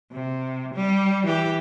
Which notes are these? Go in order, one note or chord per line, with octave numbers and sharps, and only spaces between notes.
C3
G3
E3 G4